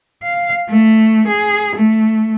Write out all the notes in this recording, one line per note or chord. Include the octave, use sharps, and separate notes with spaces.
F5
A3
G#4
A3